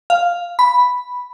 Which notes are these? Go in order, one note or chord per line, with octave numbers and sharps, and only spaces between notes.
F5
B5